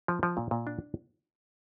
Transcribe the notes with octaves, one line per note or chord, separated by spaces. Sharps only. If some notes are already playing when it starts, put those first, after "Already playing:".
F3
F3
A#2
A#2
D4